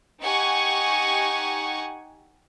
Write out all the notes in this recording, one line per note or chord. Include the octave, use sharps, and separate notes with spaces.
D#4 G4 F#5 G#5 C#6